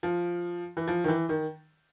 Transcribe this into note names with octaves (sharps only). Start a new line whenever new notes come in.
F3
E3
F3
D#3
E3
D#3